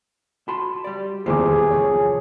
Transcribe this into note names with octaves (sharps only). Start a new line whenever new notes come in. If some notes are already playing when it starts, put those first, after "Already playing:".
F#4 A5 B5 C6
G3 D5
D#1 E2 E3 G3 G#4 C5 D6
C2 F3 C#5